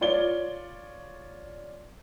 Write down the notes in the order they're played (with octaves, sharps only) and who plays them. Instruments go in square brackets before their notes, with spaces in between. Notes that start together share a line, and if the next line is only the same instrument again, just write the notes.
[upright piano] F4 C#5 D5 G7